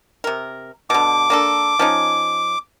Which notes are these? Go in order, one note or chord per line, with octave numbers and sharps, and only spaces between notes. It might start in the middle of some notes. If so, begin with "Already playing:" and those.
C3 A#4
B2 D3 D6
A#3 D4 A4
F3 C#4 D#4